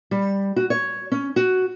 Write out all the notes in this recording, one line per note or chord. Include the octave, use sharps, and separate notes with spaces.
G3
F#4
C#5
C#4
F#4